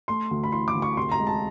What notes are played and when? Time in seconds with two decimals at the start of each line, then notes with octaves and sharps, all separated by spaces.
0.08 A3 C6
0.31 D2
0.44 B5
0.52 E3 C6
0.68 D6
0.75 D2
0.82 C#6
0.96 C2 C6
1.12 A#5
1.20 G#3
1.27 A5